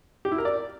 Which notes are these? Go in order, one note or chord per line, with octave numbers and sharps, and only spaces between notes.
G4
E4
A#4
D5